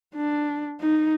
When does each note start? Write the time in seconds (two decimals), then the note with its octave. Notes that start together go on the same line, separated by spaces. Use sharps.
0.15 D4
0.80 D#4